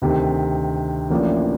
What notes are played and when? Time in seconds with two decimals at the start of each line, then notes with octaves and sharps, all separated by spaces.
0.02 D2 C3 D#3
1.10 A1 A2 F3 A#3 D4